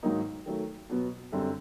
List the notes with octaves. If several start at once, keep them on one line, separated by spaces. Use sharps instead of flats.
G#2 D#3 F#3 A#3 D#4
D#3 F#3 A3
B2 F#3 B3
F#2 D3 G3 C4